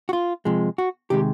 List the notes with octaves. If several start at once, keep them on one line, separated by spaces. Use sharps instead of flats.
F#4
F4
C3 F3 G#3
F#4
C3 D#3 G#3 G4